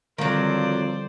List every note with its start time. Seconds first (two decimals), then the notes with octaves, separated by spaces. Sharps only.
0.18 F2 D3 D#3 F#3 G3 C5 D5 F5